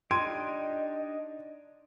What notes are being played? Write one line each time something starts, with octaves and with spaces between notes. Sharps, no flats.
D4 D#4 G4 D#5 C6 G#6 D7 D#7